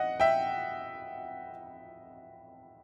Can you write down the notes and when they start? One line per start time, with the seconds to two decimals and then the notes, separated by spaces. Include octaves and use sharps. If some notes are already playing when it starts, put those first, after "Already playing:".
Already playing: D#5 F#5
0.20 E5 G5